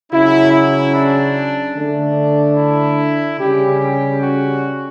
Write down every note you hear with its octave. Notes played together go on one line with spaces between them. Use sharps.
C#3 F#3 C#4 E4
E4
D4
D3 A3 D4
E4
C#3 G3 C#4 G4
G4
F#4